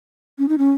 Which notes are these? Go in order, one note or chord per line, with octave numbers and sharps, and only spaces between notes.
C#4
D#4
C#4